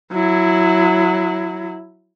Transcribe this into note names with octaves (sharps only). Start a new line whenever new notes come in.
F#3 E4